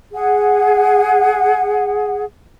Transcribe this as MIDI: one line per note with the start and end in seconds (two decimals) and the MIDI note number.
0.13 2.24 68
0.13 2.24 78